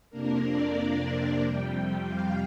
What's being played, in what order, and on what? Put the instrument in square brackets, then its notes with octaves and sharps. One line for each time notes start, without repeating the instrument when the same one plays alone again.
[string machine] F2 C3 A#3 D4 A#4
D5
F2 C3 G3 G5
G5
F5